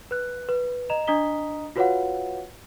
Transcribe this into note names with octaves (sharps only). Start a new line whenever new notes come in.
B4 F#6
B4
D#5 A#5 E7 F7
D4 D#5 A#5 D#6 B6 G7
F4 F#4 B4 C#5 F5 F#5